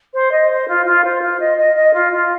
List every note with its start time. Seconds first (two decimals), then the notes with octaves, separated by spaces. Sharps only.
0.14 C5
0.31 D#5
0.50 C5
0.68 F4
0.85 F4
1.04 C5
1.21 F4
1.40 D#5
1.57 D#5
1.76 D#5
1.93 F4
2.12 F4